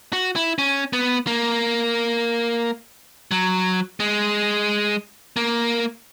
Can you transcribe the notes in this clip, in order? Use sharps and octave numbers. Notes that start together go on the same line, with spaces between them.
F#4
E4
C#4
B3
A#3
F#3
G#3
A#3